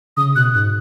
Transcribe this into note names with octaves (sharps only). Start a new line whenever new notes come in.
C#3 D#6
B2 F#6
G#2 F#6